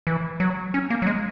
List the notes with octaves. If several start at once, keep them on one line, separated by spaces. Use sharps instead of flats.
E3
F#3
C#4
A#3
F#3
G#3